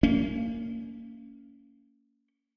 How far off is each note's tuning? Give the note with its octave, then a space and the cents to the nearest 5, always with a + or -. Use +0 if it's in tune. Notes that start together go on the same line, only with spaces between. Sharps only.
A#3 -25 C#4 +20